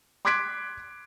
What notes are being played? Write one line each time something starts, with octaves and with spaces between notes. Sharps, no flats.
C6 D6 F#6 G#6 B6 D7